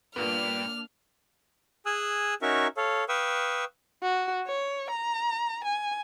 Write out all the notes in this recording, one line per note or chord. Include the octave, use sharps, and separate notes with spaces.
G2 A#2 A#3 B3 D4 F6
G#4 G#5 D#6 E6 F#6
C#4 D#4 F#4 A#4 E5 C#6
A4 C#5 F5
B4 F5 G5 C#6 D#6 E6
F#4
C#5
A#5
G#5